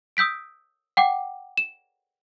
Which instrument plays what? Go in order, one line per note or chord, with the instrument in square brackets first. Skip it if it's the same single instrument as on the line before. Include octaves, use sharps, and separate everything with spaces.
[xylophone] D#6 E6 G6 B6 D7
F#5 G5 D6
E7